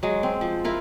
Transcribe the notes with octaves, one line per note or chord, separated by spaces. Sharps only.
F#3 G#3
C4
F3
E4 F4 A#4